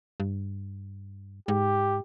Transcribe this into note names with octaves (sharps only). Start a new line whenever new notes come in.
G2
G#2 G4